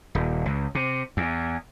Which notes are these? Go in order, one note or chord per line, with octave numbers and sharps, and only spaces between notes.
D#1
C#2
C3
E2